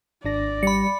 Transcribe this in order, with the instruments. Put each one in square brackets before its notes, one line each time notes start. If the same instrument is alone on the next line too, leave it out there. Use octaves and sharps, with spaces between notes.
[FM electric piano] G#1 D4 A#6 [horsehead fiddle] D5
[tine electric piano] G3 [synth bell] B5 C#7